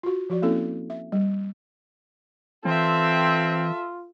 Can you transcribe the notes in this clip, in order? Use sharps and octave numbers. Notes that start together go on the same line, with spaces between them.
F4 F#4
F3 F#4 D5
A#3 C4 C#4 E4 A4
E5
G3
E3 C4 F4 A4 E5